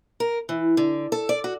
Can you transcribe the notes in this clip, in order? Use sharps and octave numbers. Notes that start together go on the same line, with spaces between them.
A#4
E3
D3
A4
D5
F#4